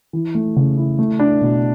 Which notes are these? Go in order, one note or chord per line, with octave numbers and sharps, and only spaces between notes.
E3
A3
C#3
E4
A3
D4
B2